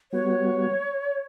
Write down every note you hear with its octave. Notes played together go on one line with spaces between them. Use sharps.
G3 B3 F#4 C#5